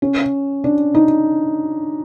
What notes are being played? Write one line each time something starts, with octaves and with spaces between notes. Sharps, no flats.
C#4
D4
D#4